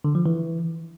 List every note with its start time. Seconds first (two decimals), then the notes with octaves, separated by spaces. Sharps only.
0.04 D3
0.15 F3
0.26 E3